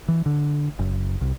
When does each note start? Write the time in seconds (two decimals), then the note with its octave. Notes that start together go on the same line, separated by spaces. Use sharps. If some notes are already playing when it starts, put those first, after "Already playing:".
0.08 E3
0.26 D3
0.79 F#1
1.21 C2